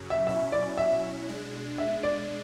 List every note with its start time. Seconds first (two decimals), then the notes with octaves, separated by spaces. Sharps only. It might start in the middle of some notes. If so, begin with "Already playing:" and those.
Already playing: F#2 C#3 F#3
0.10 E5
0.27 B2 F#3 C#4 E4 E5
0.52 D5
0.78 E5
1.28 B2 G#3 D4
1.78 E5
2.03 D5